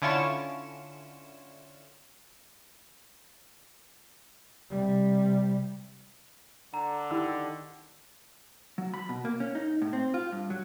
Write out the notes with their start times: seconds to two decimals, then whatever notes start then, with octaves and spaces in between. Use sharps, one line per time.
0.02 D3 C#4 E4 F4 C#6 E7
4.70 C3 G3
6.74 D3 A#5
7.11 D#3 E4 G4 E6
8.78 F#3
8.94 B5
9.09 B2
9.25 A#3
9.40 C#4
9.55 D#4
9.82 A2
9.93 C4
10.14 F4
10.32 G2
10.50 F#3